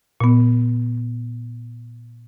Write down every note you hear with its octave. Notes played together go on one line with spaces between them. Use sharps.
A#2 B3